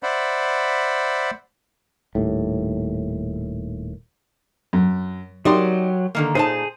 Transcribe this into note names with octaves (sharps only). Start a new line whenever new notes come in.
C5 D5 E5 F#5 B5
D#1 D#2 A2
F#2
F#3 D#4 G4 A#4 D5 C6
D3 D#3 A#3
A#2 D#4 G#4 C5 A5